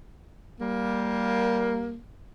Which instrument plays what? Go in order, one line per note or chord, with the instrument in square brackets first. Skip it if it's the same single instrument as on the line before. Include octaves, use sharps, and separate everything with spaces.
[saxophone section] G3 A#3